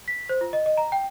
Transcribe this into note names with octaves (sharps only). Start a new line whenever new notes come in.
B6
C5
F4
D#5
D#5
A#5
G5